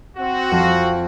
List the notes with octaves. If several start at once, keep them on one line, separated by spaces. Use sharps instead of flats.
C4 F#4
F2